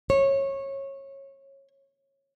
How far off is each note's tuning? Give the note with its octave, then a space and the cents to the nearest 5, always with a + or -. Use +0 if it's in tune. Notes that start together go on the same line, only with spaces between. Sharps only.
C#5 -20